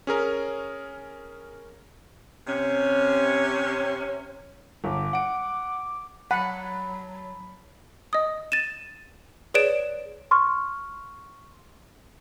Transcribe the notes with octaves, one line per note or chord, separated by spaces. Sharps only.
C#4 G#4 A#4
C3 C#4
G1 D6
F#5 D7
F#3 F#5 A5 B5
D#5 D#6
A6 D#7 E7
G#4 B4 C#5 D5 D7 E7
C6 C#6 F6